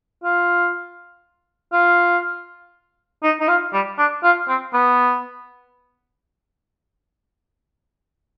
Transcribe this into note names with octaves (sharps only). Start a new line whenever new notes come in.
F4
F4
D#4
D#4
F4
G3
D4
F4
C4
B3